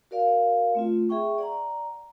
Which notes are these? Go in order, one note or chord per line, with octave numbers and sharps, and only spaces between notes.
F#4 A#4 D5 F5
A3 C4 F4
G#4 E5 G5 C#6
D5 F#5 A#5